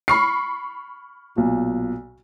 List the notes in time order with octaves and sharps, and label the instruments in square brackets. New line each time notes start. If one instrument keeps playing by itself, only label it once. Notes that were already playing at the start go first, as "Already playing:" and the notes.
[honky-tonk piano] B5 C#6 C7 [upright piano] F6
[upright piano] B1 A#2